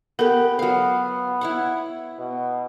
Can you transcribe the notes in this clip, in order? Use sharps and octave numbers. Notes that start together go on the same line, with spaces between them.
B3 G4 A4 A#4
F#3 B3 F5
E4 C#5 F#5
B2